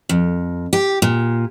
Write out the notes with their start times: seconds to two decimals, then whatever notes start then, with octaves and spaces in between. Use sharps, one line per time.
0.09 F2
0.73 G4
1.02 A#2